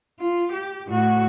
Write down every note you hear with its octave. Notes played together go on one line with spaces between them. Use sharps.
F4
G4
A2 F#4